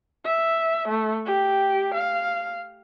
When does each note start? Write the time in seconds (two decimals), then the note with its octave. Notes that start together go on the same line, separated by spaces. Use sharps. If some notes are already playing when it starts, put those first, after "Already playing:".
0.25 E5
0.88 A3
1.26 G4
1.95 F5